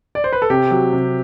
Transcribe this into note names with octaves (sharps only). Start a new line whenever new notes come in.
D5
C5
B4
A4
C3 G4
F#3
C3